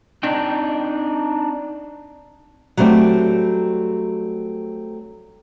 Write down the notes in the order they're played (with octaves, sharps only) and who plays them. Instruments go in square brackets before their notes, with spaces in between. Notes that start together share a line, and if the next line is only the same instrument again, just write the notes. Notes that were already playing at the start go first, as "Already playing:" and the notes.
[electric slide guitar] C4 D4 D#4 G5
[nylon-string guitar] F#3 G3 A3 C4 D4